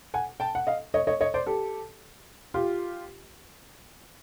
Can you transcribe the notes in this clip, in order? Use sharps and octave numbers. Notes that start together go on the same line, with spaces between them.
F#5 G#5
G5 A5
F#5
D#5 F5
C#5 D#5
C#5 D#5
C#5 D#5
C5 D5
G4 A4
F4 G4